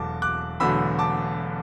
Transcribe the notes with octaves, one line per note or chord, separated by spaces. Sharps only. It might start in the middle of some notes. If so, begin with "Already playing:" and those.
Already playing: E1 E2 F#3 A3 A5 D6
D6 F#6
E1 E2 D3 F#3 A3 B5 E6
A5 D6